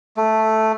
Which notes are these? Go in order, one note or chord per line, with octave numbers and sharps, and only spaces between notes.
A3